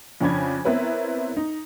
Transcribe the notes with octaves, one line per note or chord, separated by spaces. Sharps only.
F2 C#3 C#4 D4 B5 G#6
B3 C4 E4 A#4 B4 C#5
D#4